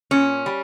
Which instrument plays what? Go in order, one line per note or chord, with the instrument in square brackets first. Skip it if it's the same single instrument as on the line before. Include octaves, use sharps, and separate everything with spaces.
[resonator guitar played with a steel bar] A#2 C#4
G3